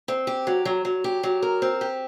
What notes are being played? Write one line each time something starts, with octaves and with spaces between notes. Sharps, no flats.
C4
G4
F#3
F#3
F#3
G4
F#3
A#4
C4
G4